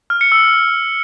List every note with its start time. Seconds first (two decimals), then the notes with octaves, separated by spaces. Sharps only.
0.10 F6
0.21 C#7
0.32 E6